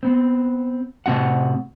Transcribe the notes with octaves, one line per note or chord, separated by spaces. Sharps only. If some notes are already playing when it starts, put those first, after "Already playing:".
B3 C4
A2 C3 C4 F#4 F#5